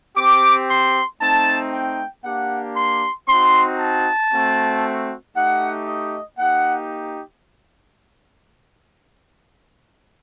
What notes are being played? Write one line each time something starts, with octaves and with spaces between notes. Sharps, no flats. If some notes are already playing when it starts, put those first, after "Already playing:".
C4 G4 D6
C6
A3 C4 D#4 A5
G5
A#3 D4 G4 F#5
C6
C4 D#4 F#4 C6
A5
A3 C4 F#4
A3 D#4 G4 F#5
D#5
A#3 D#4 G4 F#5